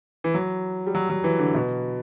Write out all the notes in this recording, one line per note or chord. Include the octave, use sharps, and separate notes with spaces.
E3
F#3
G3
F#3
F#3
E3
D3
B2